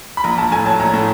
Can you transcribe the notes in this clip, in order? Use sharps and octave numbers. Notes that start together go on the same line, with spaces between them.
B5
A#1 A#5
A#1 A5
A2 G#5
F#3 A5
A#1 A#5
A2